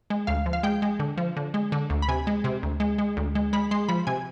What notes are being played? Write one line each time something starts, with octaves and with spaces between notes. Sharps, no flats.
G#3
D2 F5
F3
F5
G#3 G5
G#3
D3
F3
D3
G#3
D3
D2
B5
C3 G#5
G#3
C3
D2
G#3
G#3
D2
G#3
G#3 B5
G#3 C6
F3 B5
C3 G#5